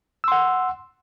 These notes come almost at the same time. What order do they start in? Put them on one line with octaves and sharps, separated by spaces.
E6 C6 F#5